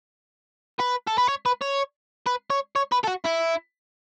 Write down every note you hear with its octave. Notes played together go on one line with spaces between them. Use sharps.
B4
A4
B4
C#5
B4
C#5
B4
C#5
C#5
B4
A4
F#4
E4